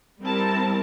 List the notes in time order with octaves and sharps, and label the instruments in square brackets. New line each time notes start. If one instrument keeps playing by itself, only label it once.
[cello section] G3 A#4 [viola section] C4 E4 A5